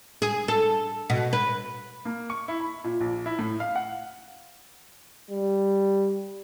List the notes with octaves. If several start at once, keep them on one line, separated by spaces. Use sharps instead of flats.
G#4
A4
B2
B4
A#3
C#6
E4
B5
A#2
A#1
E4
A2
F5
F#5
G3